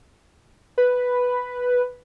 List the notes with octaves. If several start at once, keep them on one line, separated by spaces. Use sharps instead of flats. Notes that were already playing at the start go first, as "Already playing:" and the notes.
B4